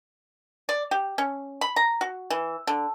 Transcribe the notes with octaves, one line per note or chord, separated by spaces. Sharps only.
D5
G4
C#4
B5
A#5
F#4
E3
D3